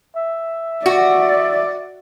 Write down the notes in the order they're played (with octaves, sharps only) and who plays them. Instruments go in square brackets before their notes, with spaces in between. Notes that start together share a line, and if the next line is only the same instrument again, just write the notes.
[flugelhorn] E5
[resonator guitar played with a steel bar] F#4 [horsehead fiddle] D5